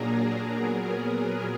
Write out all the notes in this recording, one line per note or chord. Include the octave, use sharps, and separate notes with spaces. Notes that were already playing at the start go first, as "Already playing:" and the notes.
Already playing: A#2 F#3 A#3 D4 G#4 A#4
A#2 F#3 B3